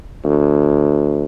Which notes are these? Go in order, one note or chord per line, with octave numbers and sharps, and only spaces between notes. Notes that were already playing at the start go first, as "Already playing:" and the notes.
D2